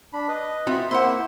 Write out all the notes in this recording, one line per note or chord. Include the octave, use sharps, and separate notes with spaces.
D4 B5
B4 D#5
C4 F4 F#4 E5
A#3 E4 C5 E5 F#5 B5 C6